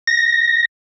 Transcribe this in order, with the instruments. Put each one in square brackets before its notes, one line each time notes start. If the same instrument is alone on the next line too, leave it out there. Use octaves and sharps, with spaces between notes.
[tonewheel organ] A#6